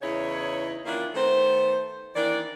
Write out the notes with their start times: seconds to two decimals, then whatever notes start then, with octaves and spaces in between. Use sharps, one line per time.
0.02 E2 C#3 D#4 E4 C#5
0.85 D#3 A#3 C#4 D4 E4 F4
1.14 D#3 A3 B3 C5
2.15 D#3 E3 A#3 D4 D5